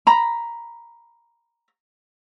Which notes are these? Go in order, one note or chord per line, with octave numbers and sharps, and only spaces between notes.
A#5 B5